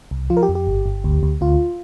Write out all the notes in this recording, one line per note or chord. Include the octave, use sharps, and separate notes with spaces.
C2
F3 F4
A#4
G4
F2
G4
G1
G1
D2
D2
D2 F4